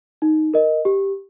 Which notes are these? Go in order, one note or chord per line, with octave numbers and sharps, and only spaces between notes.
D#4
A#4 D#5
G4